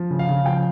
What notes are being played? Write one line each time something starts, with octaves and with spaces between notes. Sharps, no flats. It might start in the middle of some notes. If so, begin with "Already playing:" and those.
Already playing: F3
C#3
F5
C#3
F3 G5